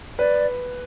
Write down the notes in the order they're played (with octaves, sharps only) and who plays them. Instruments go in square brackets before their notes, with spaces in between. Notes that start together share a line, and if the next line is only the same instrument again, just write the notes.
[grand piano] B4 [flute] D5